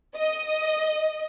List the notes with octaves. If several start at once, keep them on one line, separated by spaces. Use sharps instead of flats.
D#5